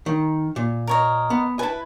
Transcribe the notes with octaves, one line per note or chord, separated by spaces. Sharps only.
D#3
A#2
A#4 C#5 D#5
B3
E4 B4 G#5 A5